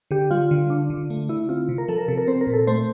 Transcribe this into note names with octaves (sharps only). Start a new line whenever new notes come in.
D3 G4
G3 F4
D3
D4
D3
A3
D3 E4
C4 F4
C3
A#4
F3 A4
A#4
C3 A4
A#4
C4 C5
A#4
A#2
A4
A3 C5